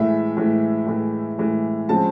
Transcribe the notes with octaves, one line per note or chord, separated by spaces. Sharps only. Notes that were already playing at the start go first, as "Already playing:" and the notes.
Already playing: A2 E3 G#3 E5
A2 E3 G#3
A2 E3 G#3
A2 E3 G#3
C#3 F3 G#3 C4 A5